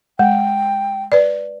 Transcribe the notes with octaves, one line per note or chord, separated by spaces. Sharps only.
G#3 G5
B4 D5